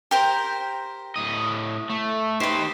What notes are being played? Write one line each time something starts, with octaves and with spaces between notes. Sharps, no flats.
G4 A#4 C5
A2 D#5
A3
D#3 G4 B4 C5